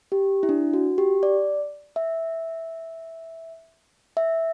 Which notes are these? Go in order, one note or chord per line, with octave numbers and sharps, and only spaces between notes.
G4
E4
D4
F#4
G4
D5
E5
E5